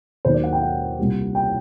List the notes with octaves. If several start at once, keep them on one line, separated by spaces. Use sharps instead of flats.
D#2 D#3 F#3 A#3 C5
D5
F#5
G5
F#5
C2 A#2 G3
G5